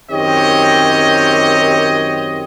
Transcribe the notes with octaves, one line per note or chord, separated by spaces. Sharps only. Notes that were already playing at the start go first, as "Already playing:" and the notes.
F#2 D#3 C4 G4 C#5 D#5